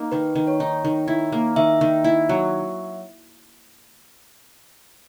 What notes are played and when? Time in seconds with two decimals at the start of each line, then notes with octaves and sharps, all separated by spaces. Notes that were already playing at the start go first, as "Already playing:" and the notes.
Already playing: A#3 D#4
0.12 D#3 B4
0.35 D#3
0.47 C#5
0.60 D#4
0.85 D#3
1.08 E4
1.32 A#3
1.56 D#3 E5
1.81 D#3
2.04 E4
2.29 F#3